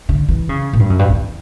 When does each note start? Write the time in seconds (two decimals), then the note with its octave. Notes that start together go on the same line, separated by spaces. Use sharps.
0.09 D3
0.29 E3
0.49 C#3
0.73 A#2
0.79 G2
0.90 F#2
0.99 G2
1.09 E2